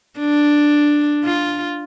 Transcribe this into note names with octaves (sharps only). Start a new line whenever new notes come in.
D4
F4